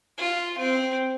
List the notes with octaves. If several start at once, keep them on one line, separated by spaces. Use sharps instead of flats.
F4
C4